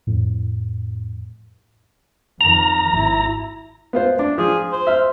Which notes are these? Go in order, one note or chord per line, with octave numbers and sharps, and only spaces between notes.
F2 A2
F2 D#3 A#5
G#1 E4
B3 F4 C5
D4
F3 G#4
C5
E5 F6